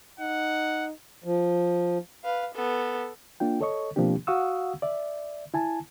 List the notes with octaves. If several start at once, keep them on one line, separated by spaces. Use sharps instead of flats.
D#4 F#5
F3
B4 F5
B3 A4
A#3 D4 F4 G5
A4 C#5 D#5 C#6
B2 F3 A#3 C4 D4 G4
F#4 F5 F#5 C#6 D#6 E6
D5 E5
E4 G#5 A5